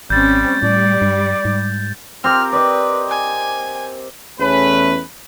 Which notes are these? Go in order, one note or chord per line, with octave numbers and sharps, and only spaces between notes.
G#1 G3 C4 C#4 G6 A6
A2 G3 D5
G2
G#2
C4 G4 A#4 F6
B4 D5 D#5
G#5
E2 A3 C#4 B4